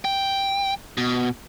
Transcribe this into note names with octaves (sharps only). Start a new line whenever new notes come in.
G5
B2